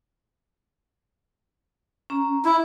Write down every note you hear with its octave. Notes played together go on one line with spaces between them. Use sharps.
C#4 A#5
E4 E5